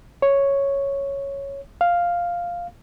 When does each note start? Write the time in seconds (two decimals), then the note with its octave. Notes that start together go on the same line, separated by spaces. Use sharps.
0.22 C#5
1.81 F5